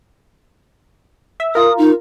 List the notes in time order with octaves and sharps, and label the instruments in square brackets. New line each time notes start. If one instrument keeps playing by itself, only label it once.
[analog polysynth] E5
[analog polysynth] F4 A#4 [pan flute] D#6
[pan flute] D#4